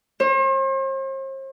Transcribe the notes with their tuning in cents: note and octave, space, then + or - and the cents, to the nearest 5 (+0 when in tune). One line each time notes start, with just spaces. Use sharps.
C5 +45